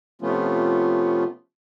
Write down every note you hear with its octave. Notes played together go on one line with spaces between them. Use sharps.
C3 F3 A3 B3 C#4 F4